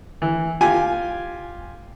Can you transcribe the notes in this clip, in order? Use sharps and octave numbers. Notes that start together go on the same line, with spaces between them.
E3
F4 G4 G#5